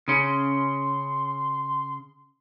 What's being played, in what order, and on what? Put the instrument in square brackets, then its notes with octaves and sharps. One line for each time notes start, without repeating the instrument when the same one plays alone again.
[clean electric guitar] C#3 C#4 [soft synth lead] C6